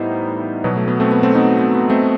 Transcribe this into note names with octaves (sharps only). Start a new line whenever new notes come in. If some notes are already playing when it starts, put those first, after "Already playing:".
Already playing: A2 E3 G3 B3 D#4 E4 C5
B2 F#3 B3
A3
B3
A3 C4
B3
A3 C4
B3 D#4
B3
B3
A3 C4